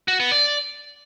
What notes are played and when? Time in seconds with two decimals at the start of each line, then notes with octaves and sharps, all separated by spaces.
0.08 F#4
0.20 B3
0.31 D5